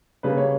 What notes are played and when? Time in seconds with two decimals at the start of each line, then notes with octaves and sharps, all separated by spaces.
0.23 C#3 G3 A#3 B4
0.37 C#5